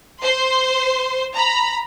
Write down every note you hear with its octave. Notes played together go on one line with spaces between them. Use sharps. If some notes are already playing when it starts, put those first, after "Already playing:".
C5 C6
A#5 B5